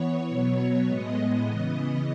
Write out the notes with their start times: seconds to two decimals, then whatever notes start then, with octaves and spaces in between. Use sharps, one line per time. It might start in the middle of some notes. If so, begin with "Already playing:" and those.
Already playing: E3 B3 C#5
0.29 B2 F#3 B3 C#5
0.87 A2 G#3 B3 D#5
1.46 C#3 E3 B3